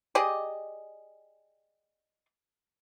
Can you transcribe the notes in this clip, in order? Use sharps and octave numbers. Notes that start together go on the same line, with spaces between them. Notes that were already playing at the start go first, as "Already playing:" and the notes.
G4 G#4 D5 D#5